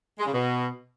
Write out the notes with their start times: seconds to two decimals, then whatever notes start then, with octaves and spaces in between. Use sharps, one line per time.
0.19 G#3
0.26 C#3
0.34 B2